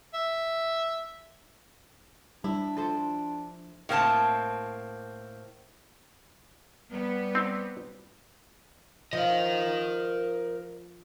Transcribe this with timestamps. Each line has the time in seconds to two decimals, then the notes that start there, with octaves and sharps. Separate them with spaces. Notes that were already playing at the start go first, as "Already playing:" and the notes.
0.14 E5
2.44 G3 D4 E4
2.77 F3 A4 C5 A5
3.89 A2 A#3 C4 A5
6.92 G3 B3
7.35 C4 D#4
9.13 F3 A#4 D#5